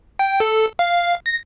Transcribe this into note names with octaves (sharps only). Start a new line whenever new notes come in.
G5
A4
F5
A#6